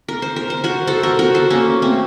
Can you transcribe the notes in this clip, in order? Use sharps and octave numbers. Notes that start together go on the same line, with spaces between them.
A#4
C5
A#4
C5
F#4 A#4
A4 C5
F#4 A#4
F#4 A#4
A4 C5
A#3 C#4
A3 C4